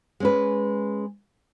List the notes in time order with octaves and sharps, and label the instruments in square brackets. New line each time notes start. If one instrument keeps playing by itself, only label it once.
[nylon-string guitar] G#3 C#4 B4